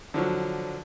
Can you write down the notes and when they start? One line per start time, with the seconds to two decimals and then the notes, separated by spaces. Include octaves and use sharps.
0.14 D3 F3 F#3